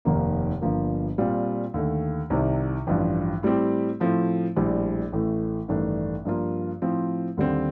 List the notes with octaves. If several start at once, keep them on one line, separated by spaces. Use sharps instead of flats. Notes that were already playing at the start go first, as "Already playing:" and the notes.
F1 D#2 D#3 A#3 D#4
G1 G2 F3 A#3
A#2 G3 C4 F4
D#2 D3 A3
C2 C3 D#3
A1 G2 F3
A2 G3 C4 G4
A2 F3 A3 C4
A#1 A2 G3
A1 A2 A3
A1 G2 D#3 A3 D4
G2 F3 A#3 F4
A2 F3 C4
D#2 D3 G3 C4